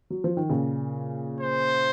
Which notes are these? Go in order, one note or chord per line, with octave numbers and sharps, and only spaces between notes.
F#3
F3
D#3
A#2 C#3
C5